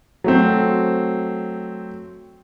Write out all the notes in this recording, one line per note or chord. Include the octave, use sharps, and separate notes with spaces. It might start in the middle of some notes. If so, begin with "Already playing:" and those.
F#3 A3 C4